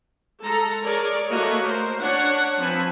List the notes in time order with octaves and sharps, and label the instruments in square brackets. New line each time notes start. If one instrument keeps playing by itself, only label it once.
[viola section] G#3 A4 A#5
G#4 A#4 C#5 D5
A3 A#3 F#4 C#5 D#5
A#4 C5
C#4 D4 C#5 F#5
F3 C4 B4 G#5 A5 B5